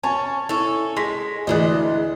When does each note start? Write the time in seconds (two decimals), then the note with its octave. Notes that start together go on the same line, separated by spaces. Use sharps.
0.03 C#4 G#5 A5
0.49 C#4 E4 A4
0.97 G#3 C6 A#6 B6
1.47 D2 E3 G#3 D4 D#5 F#6